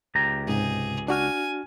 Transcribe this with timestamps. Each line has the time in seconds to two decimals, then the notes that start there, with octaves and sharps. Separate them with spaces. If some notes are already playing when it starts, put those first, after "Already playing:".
0.15 C#2 G4 A#5
0.47 G#2 C3 G#4
1.08 D4 F#4 G#5 F6